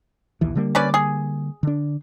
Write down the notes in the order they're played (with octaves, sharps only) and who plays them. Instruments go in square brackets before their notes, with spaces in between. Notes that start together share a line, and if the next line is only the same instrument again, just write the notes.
[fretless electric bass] A#1 D#2 E3
D3 G3 A#3
[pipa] C#4 B4 D5
G#4
[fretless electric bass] D3 D4